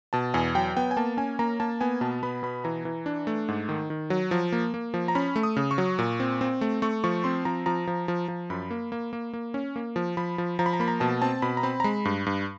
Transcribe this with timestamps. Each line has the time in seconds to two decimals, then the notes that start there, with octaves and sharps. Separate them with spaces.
0.13 B2 A5
0.34 E2 G#5
0.55 F#3 G5
0.77 B3 G5
0.91 G#5
0.97 A#3 A5
1.17 C#4 G#5
1.39 A#3 A#5
1.60 A#3 A5
1.81 B3 G#5
2.01 B2 A5
2.23 B3 B5
2.43 B2 B5
2.64 E3 A#5
2.85 E3
3.06 D4
3.27 A3
3.48 G#2
3.69 D#3
3.90 D#3
4.10 F#3
4.31 F3
4.52 A#3
4.74 A#3
4.94 F3
5.08 A#5
5.15 C#4 B5
5.36 A3
5.43 D#6
5.57 C#3
5.71 C#6
5.78 F#3
5.99 A#2
6.20 C4
6.41 C4
6.61 A3
6.82 A3 C#6
7.04 F3 C#6
7.24 C4 C6
7.45 F3 A#5
7.66 F3 A#5
7.87 F3
8.08 F3
8.28 F3
8.50 F#2 B5
8.71 A#3
8.92 A#3
9.13 A#3
9.33 A#3
9.54 C#4
9.76 A#3
9.96 F3
10.17 F3 B5
10.38 F3
10.59 F3 A#5
10.66 B5
10.73 A#5
10.80 A#3 B5
10.88 A#5
11.00 B2 A5
11.22 C4 A5
11.42 B2 B5
11.57 A#5
11.63 C4 B5
11.80 A#5
11.84 G#3 B5
12.05 G2
12.26 G2